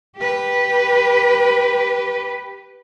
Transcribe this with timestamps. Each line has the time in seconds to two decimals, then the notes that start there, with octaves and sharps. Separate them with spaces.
0.17 G4 B4